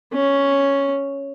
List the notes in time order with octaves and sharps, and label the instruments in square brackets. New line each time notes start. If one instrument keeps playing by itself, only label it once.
[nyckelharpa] C#4